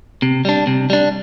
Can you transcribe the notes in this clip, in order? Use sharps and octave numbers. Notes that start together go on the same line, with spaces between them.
C3
G3 D4
C3
G3 D4